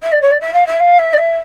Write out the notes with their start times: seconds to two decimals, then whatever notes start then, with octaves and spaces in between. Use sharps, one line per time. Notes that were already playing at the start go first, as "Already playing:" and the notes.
0.02 E5
0.12 D5
0.21 C#5
0.31 D5
0.40 E5
0.53 F5
0.66 E5
0.79 F5
0.98 E5
1.13 D5
1.17 E5